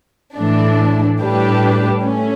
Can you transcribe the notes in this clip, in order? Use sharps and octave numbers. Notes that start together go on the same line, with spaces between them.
A2 E3 A3 D4
A2 G3 D4 G4 B4
A3 C#4